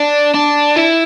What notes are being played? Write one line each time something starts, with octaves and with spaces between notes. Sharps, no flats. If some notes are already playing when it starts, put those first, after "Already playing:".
Already playing: D4
D4
E4